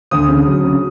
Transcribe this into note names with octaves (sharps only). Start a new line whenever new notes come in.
D2 D#6
C#3
F#3
C#3